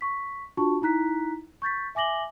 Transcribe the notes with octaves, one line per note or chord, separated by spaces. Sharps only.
C#6 B6
D4 F4 F#4 A5 C#6
D#4 E4 A#5 F#6 B6
C#6 G6 A6 B6
E5 G#5 D6 A#6 F#7 G7